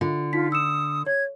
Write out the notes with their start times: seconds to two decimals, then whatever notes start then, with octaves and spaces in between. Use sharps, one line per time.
0.01 D3 F4
0.33 D#4 F4 B6
0.52 D#6 E6 C#7 E7
1.06 C#5 G#6